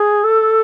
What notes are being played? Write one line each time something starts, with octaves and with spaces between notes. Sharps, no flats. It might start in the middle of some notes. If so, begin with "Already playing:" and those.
Already playing: G#4
A4